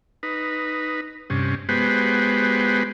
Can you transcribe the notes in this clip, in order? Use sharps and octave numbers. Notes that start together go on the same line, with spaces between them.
D#4 B4
G2 C3 C#4
G#3 B3 F#4 G4 B4 C5